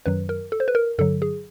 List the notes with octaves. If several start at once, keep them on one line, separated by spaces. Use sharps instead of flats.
F#2 D#3 F#3 B4
A#4
A4
C5
B4
A#4
G2 D3 F#3 A4
G#4